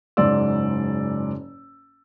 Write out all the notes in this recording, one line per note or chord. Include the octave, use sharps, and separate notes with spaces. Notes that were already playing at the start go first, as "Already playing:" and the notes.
F#1 G#2 D5 C6 E6